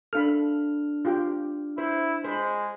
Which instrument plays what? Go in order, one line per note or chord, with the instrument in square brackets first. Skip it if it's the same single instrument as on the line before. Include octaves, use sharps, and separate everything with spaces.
[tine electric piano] D4 F6 [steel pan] A4 F5 B5
[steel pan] F4 G4 G5
[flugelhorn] E4 [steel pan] C5
[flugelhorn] G#3 [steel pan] C5 B5